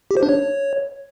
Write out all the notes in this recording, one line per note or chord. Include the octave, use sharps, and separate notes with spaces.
G4
C5
D4
C#5